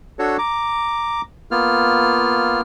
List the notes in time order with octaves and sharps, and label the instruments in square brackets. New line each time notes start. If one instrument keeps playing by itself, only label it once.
[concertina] D4 F#4 A4 C#5
A#5 D6
A#3 B3 F4 F6